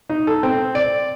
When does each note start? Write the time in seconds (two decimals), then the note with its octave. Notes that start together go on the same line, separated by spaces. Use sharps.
0.10 D#4
0.27 A4
0.43 C4
0.75 D5